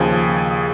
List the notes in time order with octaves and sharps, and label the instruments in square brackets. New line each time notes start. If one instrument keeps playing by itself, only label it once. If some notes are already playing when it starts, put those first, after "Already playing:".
Already playing: [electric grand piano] D#2 C#3 F3 G#4